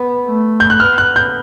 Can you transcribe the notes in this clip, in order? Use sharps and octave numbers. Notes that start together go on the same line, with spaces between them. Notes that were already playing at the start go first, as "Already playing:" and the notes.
Already playing: B3
A3
G6
F#6
B3 F6
F#6
G6